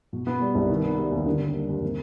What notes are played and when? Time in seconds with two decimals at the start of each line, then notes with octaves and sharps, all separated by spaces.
0.13 B2
0.27 B3
0.42 G3
0.55 C2
0.69 D#3
0.84 B3
0.98 G3
1.12 D#2
1.26 D3
1.40 D#2
1.54 G3
1.69 D#2
1.82 C3